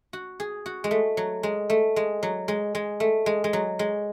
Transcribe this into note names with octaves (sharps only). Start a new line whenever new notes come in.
F#4
G#4
F#4
G#3
A3
F#3
G#3
A3
G#3
F#3
G#3
G#3
A3
G#3
G#3
F#3
G#3